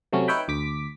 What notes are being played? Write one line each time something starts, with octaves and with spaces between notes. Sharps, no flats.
C3 F#3 A3 C#4
D#4 B4 C#5 E5 G5 B5
D2 D6 B6